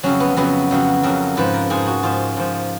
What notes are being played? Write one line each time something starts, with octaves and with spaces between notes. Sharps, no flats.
F2 C#3 F#3 C#4
B3
F2 C#3 F#3 B3
F2 C#3 F#3
F2 C#3 F#3 A#4
G#2 F3 B4
A#4
G#2 F3 G#4
F#4
G#2 F3 F4
G#2 F3